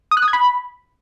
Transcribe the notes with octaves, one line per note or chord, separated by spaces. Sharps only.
D#6
F#6
D#6
G#6
B5